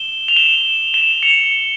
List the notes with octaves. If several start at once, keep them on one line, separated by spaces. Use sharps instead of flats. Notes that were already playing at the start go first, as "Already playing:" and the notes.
Already playing: E7 G7
F7
E7 G7
E7 G7
C#7 F7